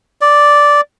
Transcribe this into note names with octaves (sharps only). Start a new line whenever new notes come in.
D5